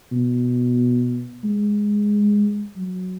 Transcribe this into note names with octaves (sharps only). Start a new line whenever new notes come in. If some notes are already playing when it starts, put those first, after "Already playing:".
B2
G#3
F#3